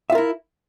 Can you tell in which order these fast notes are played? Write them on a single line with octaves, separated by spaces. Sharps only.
E5 F4 A#4 E4